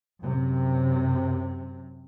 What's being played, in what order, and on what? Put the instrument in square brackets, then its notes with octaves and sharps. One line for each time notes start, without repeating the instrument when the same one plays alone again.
[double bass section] F#2 C3